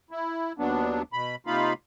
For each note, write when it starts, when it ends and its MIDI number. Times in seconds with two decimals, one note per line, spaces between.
0.11 0.53 64
0.58 1.02 39
0.58 1.02 54
0.58 1.02 59
0.58 1.02 62
1.13 1.36 47
1.13 1.36 83
1.47 1.73 48
1.47 1.73 58
1.47 1.73 63
1.47 1.73 65
1.47 1.73 77
1.47 1.73 83